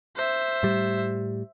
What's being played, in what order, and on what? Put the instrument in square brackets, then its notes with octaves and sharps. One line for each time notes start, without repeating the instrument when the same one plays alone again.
[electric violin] C5 E5
[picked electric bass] A2 G3